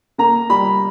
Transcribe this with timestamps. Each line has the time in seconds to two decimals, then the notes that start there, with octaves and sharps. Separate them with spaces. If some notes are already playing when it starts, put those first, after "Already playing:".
0.18 A#3 A#5
0.50 G3 B5